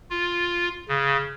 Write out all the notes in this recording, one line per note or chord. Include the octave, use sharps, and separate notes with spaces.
F4
C#3